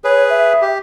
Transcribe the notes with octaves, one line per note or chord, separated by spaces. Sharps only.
G#4 B4 C#5
E5
G4